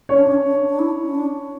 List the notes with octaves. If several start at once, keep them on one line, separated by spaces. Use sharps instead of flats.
C#4 C#5
D4
C#4
D4
D4
E4
C#4
D4